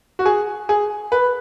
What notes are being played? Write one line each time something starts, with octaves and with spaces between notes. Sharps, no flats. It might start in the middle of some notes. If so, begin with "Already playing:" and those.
F#4
G#4
G#4
B4